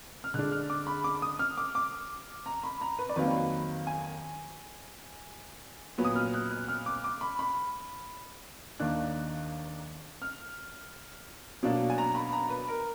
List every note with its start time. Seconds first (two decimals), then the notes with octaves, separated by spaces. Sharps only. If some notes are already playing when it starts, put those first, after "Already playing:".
0.24 F6
0.34 D3 G#3 D4 F#6
0.51 F6
0.70 D6
0.87 B5
1.04 D6
1.22 D#6
1.39 F6
1.57 D6
1.75 D6
2.46 A#5
2.64 B5
2.81 A#5
2.99 B4
3.09 D5
3.16 F2 D#3 F#3 A#3 B4
3.87 G#5
5.98 A#2 F#3 B3
6.05 D#6
6.15 F6
6.34 F#6
6.51 F#6
6.69 F6
6.86 D6
7.04 D6
7.21 B5
7.39 B5
8.80 D#2 D#3 A#3 D4 F#6
10.22 F6
11.63 B2 F#3 A#3 D4
11.90 G#5
11.98 A#5
12.15 B5
12.33 A#5
12.50 B4
12.68 A#4